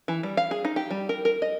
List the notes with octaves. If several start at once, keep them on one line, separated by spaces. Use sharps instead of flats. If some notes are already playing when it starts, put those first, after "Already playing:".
E3
G3
F5
G#4
D#4
G4
G3
A#4
A#4
D#5